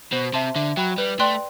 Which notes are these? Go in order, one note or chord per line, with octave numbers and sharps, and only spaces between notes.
B2 C5
C3 E5 A5 C6
D3 E5
F#3 G5 B5 F#6
G3 B4
A3 D5 G5 C6 F#6